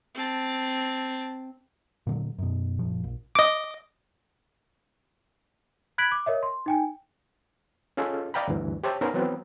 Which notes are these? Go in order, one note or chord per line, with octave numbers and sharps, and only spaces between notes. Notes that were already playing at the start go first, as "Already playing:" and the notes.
C4 A5
A#2 D3 F#3
F#2 B2
F#1 A#2 F3
A#1
D#5 D6
B5 F#6 G#6 B6 D7 F#7
D6
A#4 C#5 D#5 E5
C6
D#4 G5 G#5
C#4 F4 G#4 A4 D#5
D5 D#5 F5 G5 A#5 B5
D2 G2 E3
G4 C5 C#5 E5 A5
B3 C#4 D#4 A#4 C5
E3 F#3 B3 C4